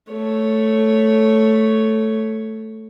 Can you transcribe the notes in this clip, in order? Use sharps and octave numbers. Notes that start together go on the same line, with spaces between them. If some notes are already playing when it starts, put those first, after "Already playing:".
A3 C#5